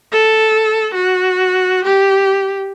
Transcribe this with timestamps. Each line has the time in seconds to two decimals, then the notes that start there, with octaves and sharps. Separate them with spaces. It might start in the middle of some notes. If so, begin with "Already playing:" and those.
0.12 A4
0.94 F#4
1.85 G4